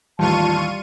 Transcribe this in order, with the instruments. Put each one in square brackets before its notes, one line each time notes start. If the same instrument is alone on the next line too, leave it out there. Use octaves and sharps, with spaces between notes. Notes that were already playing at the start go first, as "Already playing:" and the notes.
[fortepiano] A1 D#2 [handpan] G3 [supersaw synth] F4 C#6 D#7 [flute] A5